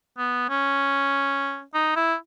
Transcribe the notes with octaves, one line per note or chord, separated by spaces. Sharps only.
B3
C#4
D#4
E4